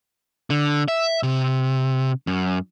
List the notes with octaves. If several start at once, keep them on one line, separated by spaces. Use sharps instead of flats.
D3
E5
C3
F#2